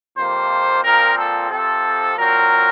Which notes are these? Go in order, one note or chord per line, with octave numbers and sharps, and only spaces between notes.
F2 C3 F3 A#3 C5
A#2 F3 C4 A#4
A4
C3 F3 C4 A4
A#2 F#3 C4 A#4